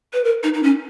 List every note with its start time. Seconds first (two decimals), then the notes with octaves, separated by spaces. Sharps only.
0.14 B4
0.24 A#4
0.43 D#4
0.54 D#4
0.63 C#4